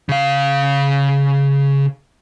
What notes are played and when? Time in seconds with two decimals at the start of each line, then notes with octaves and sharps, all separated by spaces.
0.09 C#3 F5